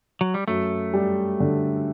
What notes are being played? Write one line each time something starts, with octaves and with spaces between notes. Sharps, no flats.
F#3
G3
F#2 A3
G3
D3